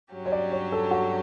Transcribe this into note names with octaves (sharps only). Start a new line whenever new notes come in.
G2 F#3 C#4 G4
C#5
D5
C#5
A4
F#4